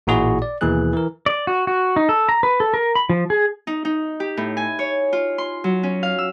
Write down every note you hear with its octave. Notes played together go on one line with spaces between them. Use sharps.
A1 A#2 E4 F#4 G#4
D5
D#2 B2 E3 A#3 G#4 F#6
E3 A#4
D5
F#4
F#4
D#4
A4
A#5
B4
A4
A#4
B5
F3
G#4
D#4
D#4
G4
A2
G#5
C#5
F4
C6
F#3
C#4
F5
E6